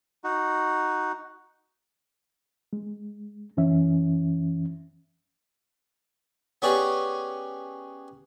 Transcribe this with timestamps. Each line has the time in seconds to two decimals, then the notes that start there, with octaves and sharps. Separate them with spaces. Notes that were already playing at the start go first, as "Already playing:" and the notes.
0.24 D#4 F#4
2.73 G#3
3.57 F#2 E3 C#4 E5
6.62 B3 C#4 G4 G#4 C#5 D5